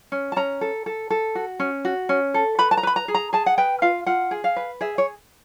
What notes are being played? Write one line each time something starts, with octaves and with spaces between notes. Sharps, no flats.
C#4
A5
C#4 A#5
A4
A4
A4
F#4
C#4
F#4
C#4
A4
B4 B5
A5
A#5
B4 B5
A#5
G#4
A#5
G#4 A5
F#5
B4 G5
F4 F5
F4 F#5
G#4
F5
B4
G#4 E5
C#5